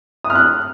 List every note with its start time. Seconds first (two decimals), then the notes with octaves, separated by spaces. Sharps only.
0.24 D#6
0.30 F6
0.35 F#6